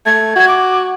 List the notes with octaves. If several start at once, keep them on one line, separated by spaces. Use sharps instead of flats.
A3 G#6
F#4 G#6
D6